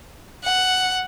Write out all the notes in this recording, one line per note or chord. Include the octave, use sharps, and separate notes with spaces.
F#5